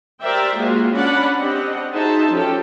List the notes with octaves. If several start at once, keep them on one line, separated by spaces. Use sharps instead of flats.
G4 A#4 C5 D5 E5 G5
G#3 A#3 F4 F#4 G#4
C#4 D4 D5 F#5 B5
C4 D4 G4 D#5 F#5
D#4 F#4 G#4 C5 E5 A5
F3 C#4 G4 A4